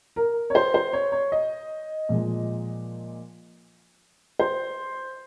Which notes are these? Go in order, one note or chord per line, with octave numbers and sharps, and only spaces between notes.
A#4
C#5
C5
C5
C#5
C#5
D#5
A#2 F3 G#3
C5